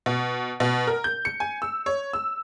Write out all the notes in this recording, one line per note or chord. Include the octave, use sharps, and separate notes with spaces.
B2
B2
A#4
G6
C#7
G#5
E6
C#5
E6